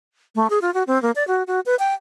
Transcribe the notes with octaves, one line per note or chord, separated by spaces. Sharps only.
A3
G#4
F4
F#4
C4
A#3
D5
F#4
F#4
B4
G5